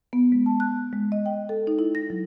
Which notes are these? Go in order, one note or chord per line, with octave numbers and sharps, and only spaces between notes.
B3
G#3
A5
F#6
G#3
D#5
G5
A4
D#4
E4
A#6
F#3